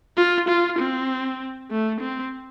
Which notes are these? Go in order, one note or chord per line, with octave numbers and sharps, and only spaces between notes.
F4
F4
C4
A3
C4